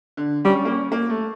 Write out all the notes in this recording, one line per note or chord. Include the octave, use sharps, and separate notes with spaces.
D3
G3 C#4
A#3
C#4
A#3
A3